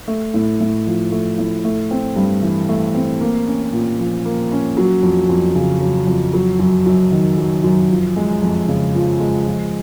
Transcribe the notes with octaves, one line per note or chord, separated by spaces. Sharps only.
A3
A2
A2
F3
A3
A2
A3
C4
G2
E3
A3
C4
A#3
C#4
A#2
F3
A#3
C#4
F#3
F2
F2
C#3
F#3
F2
F#3
F#2
F#2
D#3
F#3
F#2
F3
G#3
F2
C#3
F3
G#3
F3